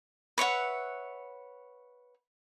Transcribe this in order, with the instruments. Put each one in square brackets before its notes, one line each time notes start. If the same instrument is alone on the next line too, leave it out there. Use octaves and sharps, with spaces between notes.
[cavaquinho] B4 C#5 E5 F#5